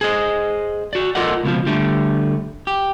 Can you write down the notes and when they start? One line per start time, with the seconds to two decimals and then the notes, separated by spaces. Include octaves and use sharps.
0.01 G#4 C5 D#5
0.93 F#4 D5
1.15 F4 A4 A#4 D5 D#5 F#5
1.43 C#2 B2 E3 F3
1.66 D3 G3 A3
2.67 G4